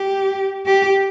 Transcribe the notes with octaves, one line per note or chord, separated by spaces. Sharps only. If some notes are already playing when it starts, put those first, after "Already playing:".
Already playing: G4
G4